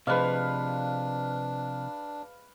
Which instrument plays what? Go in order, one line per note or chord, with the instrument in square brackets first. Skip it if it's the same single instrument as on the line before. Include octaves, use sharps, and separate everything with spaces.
[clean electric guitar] C3 F3 [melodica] D4 [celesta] G#4 C5 D#5 [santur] B4 F5